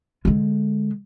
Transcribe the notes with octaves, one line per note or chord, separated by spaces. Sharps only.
D3 G#3